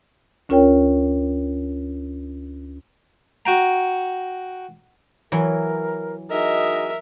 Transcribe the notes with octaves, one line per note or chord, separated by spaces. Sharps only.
D2 C#4 F4 A#4 C#5 G5
F#4 G5 A#5
E3 F#3 E4 A#4
D#4 F#4 G#4 A#4 D#5 E5